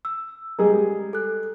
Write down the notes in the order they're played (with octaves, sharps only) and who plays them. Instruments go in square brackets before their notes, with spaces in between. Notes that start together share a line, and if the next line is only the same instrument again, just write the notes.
[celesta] E6
[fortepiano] G3 G#3 G#4 [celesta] A#5
[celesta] A4 F#6